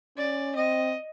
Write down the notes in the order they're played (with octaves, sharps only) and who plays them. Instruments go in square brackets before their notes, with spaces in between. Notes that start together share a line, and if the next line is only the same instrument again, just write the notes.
[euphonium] C#4 [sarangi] D5
[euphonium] C4 [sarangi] D#5